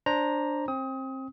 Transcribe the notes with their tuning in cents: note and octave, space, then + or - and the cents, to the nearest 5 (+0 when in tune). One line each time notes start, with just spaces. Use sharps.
D4 +0 C5 +15 A#5 +5
C4 +25 D#6 +30